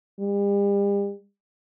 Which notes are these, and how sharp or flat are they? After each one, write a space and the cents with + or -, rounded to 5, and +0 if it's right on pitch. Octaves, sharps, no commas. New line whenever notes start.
G3 +40